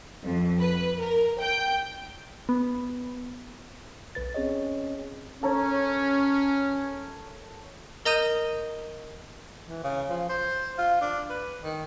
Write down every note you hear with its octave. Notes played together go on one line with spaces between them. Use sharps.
F2
B4
A#4
G5
B3
B1 B4 A6
C4 C#4 G#4 C#5 D#5
C#4 A4 A#4 C#5
A#4 D#5 A#5 D#6 G6 D#7
E3
C#3
F3
C5
F4
D4
B4
D#3